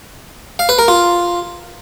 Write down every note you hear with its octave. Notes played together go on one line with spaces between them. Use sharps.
F5
B4
A#4
F4